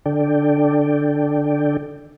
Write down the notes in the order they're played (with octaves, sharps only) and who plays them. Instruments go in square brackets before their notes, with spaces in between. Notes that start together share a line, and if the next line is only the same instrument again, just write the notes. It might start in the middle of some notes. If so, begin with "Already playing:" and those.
[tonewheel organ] D3 D4 A4 D5 G5